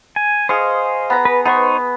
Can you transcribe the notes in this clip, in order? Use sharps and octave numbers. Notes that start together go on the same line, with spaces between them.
G#5
G#4 C5 D#5 F5 C#6
B3 A#5
B4
B3 D#4 C5 C#6